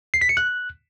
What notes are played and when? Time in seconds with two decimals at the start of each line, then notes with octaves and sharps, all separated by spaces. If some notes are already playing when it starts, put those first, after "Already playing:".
0.14 C7
0.21 B6
0.29 C#7
0.37 F#6